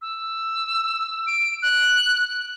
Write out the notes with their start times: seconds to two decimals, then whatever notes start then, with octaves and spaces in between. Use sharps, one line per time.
0.02 E6
1.27 D7
1.62 F#6